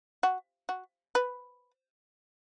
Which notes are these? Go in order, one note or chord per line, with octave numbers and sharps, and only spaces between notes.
F#4
F#4
B4